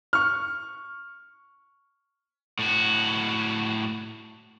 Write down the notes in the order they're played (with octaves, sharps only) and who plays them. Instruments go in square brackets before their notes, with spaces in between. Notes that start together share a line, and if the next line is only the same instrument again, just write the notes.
[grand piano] C#6 F6
[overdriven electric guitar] A2 F#4